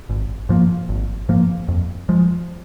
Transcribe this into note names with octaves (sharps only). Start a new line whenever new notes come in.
G#1
G#2 F3 A#3
G#1
G#2 F3 A#3
F2
F3 G#3